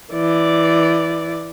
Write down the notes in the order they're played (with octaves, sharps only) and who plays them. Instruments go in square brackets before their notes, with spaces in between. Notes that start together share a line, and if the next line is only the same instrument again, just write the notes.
[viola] E3 D5